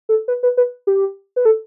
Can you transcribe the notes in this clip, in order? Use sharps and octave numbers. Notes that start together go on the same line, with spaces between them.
A4
B4
B4
B4
G4
B4
A4